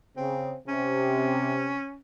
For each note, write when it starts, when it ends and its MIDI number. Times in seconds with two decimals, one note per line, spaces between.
0.17 0.50 49
0.17 0.57 60
0.68 1.75 48
0.68 1.98 61